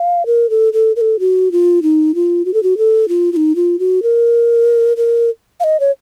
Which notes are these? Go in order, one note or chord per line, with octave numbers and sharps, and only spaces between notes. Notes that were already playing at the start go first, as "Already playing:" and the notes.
Already playing: F5
A#4
A4
A4
A#4
A4
F#4
F4
D#4
F4
F#4
A4
F#4
A4
F4
F4
D#4
F4
F#4
A#4
A#4
F5
D#5
C#5